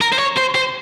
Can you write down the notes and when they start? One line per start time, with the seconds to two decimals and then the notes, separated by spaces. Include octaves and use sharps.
0.01 A#4
0.13 C5
0.19 C#5
0.38 C5
0.56 C5